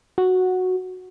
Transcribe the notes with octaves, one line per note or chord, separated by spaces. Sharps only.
F#4